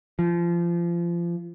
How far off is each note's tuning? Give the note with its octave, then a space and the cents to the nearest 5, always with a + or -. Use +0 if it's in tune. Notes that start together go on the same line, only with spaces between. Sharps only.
F3 -25